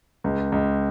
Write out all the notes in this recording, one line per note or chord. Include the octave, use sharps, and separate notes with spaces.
C#2
C#2